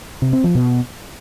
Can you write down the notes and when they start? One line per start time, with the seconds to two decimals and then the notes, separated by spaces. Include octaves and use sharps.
0.22 C3
0.33 C4
0.44 F3
0.55 B2